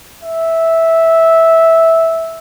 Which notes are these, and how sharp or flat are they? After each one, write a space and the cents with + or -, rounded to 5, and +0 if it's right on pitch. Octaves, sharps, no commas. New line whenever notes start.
E5 -10